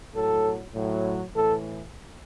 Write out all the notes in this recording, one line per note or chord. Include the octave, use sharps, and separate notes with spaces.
A2 F#3 A4
A2 F#3
A2 E3 A4